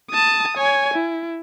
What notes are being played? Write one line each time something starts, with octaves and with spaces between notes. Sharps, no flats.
A5 D#6
C#5 G#5
E4